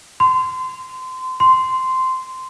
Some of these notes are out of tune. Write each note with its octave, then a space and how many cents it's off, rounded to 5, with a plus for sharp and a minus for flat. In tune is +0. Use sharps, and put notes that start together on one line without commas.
C6 -25
C6 -10